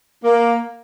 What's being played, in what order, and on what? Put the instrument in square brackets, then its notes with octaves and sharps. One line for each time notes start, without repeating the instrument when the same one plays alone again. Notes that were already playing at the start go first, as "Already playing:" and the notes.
[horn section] A#3